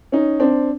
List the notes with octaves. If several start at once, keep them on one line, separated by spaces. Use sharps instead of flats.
C#4 D#4
C4 D4